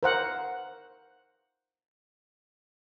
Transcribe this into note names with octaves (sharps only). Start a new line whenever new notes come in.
A#4 C5 F#5